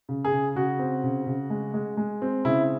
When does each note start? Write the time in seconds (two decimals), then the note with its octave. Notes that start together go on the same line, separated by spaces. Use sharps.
0.09 C#3
0.25 G#4
0.32 C#3
0.56 C#3 F#4
0.79 C4
1.04 C#3
1.27 C#3
1.50 G#3
1.74 G#3
1.97 G#3
2.22 C4
2.45 C#3 E4